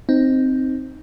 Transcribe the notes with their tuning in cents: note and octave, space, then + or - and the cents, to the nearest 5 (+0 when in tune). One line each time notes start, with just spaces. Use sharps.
C4 +0 D#4 +0